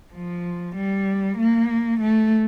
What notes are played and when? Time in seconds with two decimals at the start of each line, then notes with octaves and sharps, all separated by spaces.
0.13 F3
0.75 G3
1.38 A#3
2.00 A3